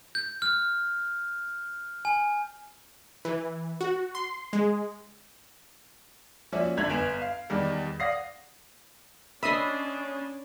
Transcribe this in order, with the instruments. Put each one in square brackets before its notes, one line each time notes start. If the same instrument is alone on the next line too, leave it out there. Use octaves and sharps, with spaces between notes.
[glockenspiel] G6
F6
G#5
[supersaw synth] E3
F#4
C6
G#3
[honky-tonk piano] F3 A#3 C#4 F#4 D5 E5
G#1 D3 A3 G#6 F7 F#7
G1 B3 G#5 D7 E7 F7
F5
E2 D#3 G3
D5 F5 F#5 D#6 A#6 C7
[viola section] C#4 D4 [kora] D#5 E5 [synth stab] B5 D#6 C7